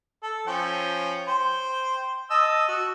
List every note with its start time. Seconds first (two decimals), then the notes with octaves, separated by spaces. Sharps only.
0.23 A4
0.48 F3 C#4 G5
1.27 C5 G5
2.30 D#5 A5 E6
2.68 F#4